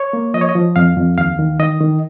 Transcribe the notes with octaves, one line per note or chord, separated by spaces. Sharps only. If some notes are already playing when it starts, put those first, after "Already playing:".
Already playing: C#5
A#3
F3 D#5
C#5
D#5
F3
F2 F5
F2
D#2 F5
D#3
D#3 D#5
D#3